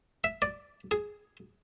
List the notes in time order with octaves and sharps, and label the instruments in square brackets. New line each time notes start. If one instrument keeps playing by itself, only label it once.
[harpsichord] E5
D5
G#4